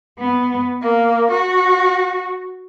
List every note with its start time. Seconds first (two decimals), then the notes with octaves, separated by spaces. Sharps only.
0.19 B3
0.81 A#3
1.32 F#4